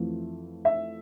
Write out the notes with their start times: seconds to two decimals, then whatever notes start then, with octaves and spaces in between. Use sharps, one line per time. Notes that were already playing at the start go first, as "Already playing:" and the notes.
Already playing: F2 E3 A3
0.65 E5